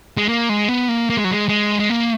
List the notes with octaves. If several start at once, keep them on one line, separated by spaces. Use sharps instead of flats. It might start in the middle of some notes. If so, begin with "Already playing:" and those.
G#3
A#3
G#3
B3
A#3
A#3
G#3
F#3
G#3
G#3
G#3
A#3